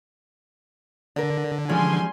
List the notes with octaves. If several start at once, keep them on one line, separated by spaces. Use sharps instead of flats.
D3 A#4 D5
E3 F3 G3 G#3 C#4 G#5 C6